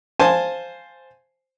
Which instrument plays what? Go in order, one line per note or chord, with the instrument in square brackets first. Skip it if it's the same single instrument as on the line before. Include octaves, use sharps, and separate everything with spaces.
[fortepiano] C5 F5 G#5 A5 C6